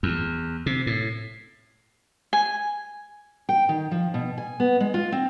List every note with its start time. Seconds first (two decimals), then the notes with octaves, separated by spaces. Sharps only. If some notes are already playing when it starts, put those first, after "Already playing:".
0.03 E2
0.66 C3
0.87 A2
2.33 G#5
3.49 G5
3.69 D#3
3.91 F3
4.14 B2
4.38 G#5
4.60 B3
4.80 G#3
4.94 F4
5.12 C4